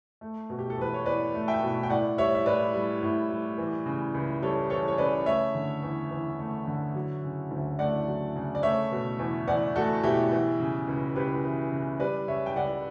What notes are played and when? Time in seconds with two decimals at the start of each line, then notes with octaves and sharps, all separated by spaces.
0.21 A3
0.50 B2
0.59 G4
0.70 A4
0.78 E2 B4
0.94 C#5
1.06 E2 B4 D5
1.34 A3
1.48 E5 G5
1.63 B2
1.83 G5
1.90 A2 D5 F#5
2.18 G3 C#5 E5
2.35 E5
2.46 A2 B4 D5
2.74 G3
3.03 A2
3.31 G3
3.58 E3
3.86 C#3
4.14 C#2
4.42 G3 A4 C#5
4.70 E3 A4 C#5
4.88 C#5
4.98 C#3 B4 D5
5.26 A3 C#5 E5
5.55 D3
5.83 E2
6.11 E2
6.39 A3
6.67 D3
6.95 F#3
7.24 C#3
7.51 D2
7.79 A3 D5 F#5
8.07 F#3
8.36 C#3
8.55 D5
8.63 A3 C#5 E5
8.91 B2
9.19 E2
9.47 E2 D5 F#5
9.76 A3 F#4 A4
10.03 B2 E4 G4
10.32 E3
10.60 C#3
10.88 C#2
11.16 C#2 G4 B4
11.44 E3
11.72 C#3
12.00 G3 B4 D5
12.28 C#3 C#5 E5
12.46 G5
12.56 C#2 D5 F#5